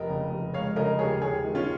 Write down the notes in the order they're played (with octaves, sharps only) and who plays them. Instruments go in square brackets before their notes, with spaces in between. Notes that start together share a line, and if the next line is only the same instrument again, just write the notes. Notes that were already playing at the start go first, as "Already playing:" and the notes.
Already playing: [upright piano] F1 A#4 D#5
C#3
F1
G#3 C#5 F5
C#3 A#4 D#5
D#2 G#4 C#5
D#2 G#4 C#5
D#3
C#4 F4